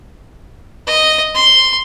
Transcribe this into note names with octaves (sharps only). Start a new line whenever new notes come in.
D#5
C6